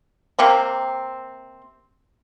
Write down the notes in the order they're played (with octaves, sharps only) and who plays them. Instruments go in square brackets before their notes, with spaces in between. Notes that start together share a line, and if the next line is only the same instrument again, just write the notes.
[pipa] C3 A#3 C4